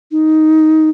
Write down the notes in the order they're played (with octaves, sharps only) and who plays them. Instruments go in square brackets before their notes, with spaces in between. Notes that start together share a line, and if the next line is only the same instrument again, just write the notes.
[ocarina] D#4